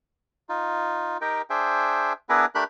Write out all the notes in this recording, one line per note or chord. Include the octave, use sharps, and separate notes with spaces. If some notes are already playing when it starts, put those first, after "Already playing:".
D#4 F4
D#4 G4 A#4 G5
D4 G#4 C5 E5 G5
B3 D4 E4 G#4 A#4 B4
A3 D4 G4 A#4 B5 F#6